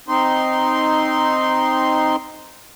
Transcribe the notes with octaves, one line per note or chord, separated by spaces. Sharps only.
C4 D#4 C6